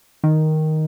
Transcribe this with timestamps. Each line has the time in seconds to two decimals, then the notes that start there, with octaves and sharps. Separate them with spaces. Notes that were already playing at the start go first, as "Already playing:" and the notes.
0.24 D#3